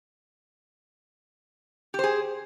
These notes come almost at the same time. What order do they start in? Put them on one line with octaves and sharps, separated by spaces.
G4 C5 G#4